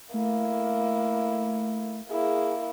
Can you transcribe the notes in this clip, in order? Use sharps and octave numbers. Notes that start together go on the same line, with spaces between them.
A3 A#3 E4
A#3 E4 G#4